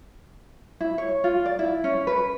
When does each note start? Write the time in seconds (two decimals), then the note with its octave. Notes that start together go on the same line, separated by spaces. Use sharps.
0.81 E4
0.98 C#5
1.24 F4
1.46 D5
1.59 E4
1.84 C#4
2.07 B4